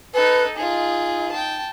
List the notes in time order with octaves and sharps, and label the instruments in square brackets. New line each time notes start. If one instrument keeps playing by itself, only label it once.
[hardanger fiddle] D#4 A4 [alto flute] B4
[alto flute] D#4 [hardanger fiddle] F4 G#4
[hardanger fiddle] G5 A5